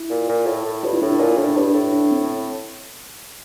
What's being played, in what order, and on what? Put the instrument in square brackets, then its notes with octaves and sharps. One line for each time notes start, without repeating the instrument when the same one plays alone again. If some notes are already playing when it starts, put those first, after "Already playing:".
Already playing: [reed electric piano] E4
[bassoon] A#2
A#2
A2
A2
[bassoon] G2 [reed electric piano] F4
[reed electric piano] E4
[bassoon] A2 [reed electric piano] D4
[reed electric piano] E4
[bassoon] A#2
[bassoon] A2 [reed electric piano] D4
[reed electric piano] E4
[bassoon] G2 [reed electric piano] D4
[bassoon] A2
[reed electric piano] D4
C4